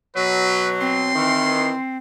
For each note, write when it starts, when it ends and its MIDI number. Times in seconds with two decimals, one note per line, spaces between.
0.16 1.10 47
0.16 1.10 54
0.16 0.72 71
0.81 1.97 60
0.81 1.82 84
1.15 1.73 51
1.15 1.73 52